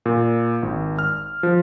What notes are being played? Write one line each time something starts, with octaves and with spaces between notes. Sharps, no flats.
A#2
G#1
F6
F3